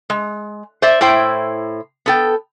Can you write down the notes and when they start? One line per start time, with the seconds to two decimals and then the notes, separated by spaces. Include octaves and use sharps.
0.10 G#3
0.82 C5 D5 E5
1.01 A2 E4 C5 G5
2.06 B3 A4 G5